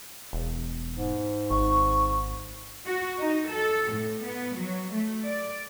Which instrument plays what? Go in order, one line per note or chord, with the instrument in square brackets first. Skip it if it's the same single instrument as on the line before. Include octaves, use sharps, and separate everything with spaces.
[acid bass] E1
[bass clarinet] G#2
[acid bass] G#1 [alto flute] C#6
[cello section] F#4
D#4
A4
A2
B3
F#3
A3
D5